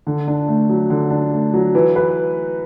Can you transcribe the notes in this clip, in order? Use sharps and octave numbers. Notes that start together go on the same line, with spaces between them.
D3
D4
A3
F#3
D3
D4
A3
F#3
E3
B4